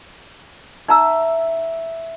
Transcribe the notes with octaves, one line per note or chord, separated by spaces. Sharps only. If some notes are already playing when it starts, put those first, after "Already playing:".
D#4 E5 F#5 A#5 B5 E6